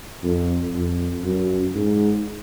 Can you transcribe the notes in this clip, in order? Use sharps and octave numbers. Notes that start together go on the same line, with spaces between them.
F2
F2
F#2
G#2